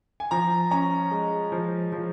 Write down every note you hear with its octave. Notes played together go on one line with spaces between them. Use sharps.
G#5
F3 A#5
C#4 A#5
G#3
F3
F3